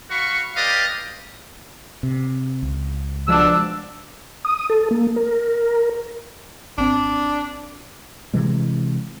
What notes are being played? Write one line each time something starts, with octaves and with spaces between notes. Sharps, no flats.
F#4 F5 B5 C#6
G4 B4 D5 D#5 F5
C3
C#2
B2 F3 G#3 D4 E6
D#6
A4
A#3
A#4
G#1 C4 D4
C3 E3 G#3